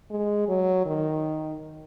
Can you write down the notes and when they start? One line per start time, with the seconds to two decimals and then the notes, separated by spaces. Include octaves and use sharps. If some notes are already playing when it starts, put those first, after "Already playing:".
0.11 G#3
0.48 F#3
0.86 D#3